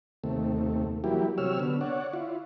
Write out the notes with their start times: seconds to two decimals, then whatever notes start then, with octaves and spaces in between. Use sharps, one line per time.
0.24 D#2 C3 A3
1.04 E3 F#3 G3 A#3 E4 G4
1.38 C3 F#3 G4 C#5 E6 F6
1.60 D3 B3
1.81 C#5 D5 F#5
2.13 E4 F4